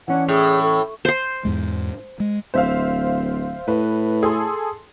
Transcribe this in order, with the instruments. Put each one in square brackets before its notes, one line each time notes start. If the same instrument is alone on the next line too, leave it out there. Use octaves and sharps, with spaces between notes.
[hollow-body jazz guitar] E3 C#4 D4 [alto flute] F#5
[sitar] A2 [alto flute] G#4
[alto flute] A4
[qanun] C5 C6
[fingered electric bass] E2 G#2 G#3
G#3
[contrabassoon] D1 [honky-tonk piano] C5 E5 F5
[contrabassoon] A2 [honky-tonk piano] B4
[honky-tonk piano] G#4 A4 C6